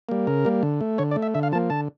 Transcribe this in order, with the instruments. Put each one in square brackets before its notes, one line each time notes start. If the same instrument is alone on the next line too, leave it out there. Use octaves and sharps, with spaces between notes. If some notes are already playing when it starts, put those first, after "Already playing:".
[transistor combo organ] G3 A#3
C#3 A#4
G3 A#3
D3
A3
D3 C#5
D5
A3
E5
D3 E5
F5
F3 A#3 A5
D3 A5